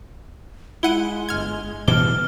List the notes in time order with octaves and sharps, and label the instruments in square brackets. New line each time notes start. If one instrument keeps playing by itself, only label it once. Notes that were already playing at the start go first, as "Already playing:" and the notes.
[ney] G#3 [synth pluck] E4 F#5 D#7 [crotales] G7
[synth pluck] G1 F6 G#6
[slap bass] B2 E3 G3 [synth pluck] D6 [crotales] F6 G7